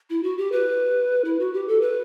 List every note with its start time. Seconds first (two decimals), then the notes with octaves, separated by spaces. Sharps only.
0.10 E4
0.23 F#4
0.38 G4
0.52 B4
1.25 E4
1.39 F#4
1.54 G4
1.68 A4
1.81 B4